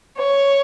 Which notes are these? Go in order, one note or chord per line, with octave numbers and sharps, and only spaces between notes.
C#5